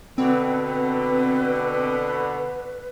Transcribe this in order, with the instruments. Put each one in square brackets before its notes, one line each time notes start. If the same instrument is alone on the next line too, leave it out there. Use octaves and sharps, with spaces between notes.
[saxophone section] B2 D3 [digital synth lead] C4 [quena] B4